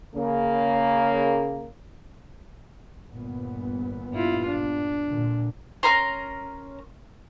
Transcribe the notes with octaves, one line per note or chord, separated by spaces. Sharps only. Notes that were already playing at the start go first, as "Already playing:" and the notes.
C#3 A#3
G1 A#2 B3
G2 E4 F4
D4
A#2 D3
C#4 A#4 A#5 C6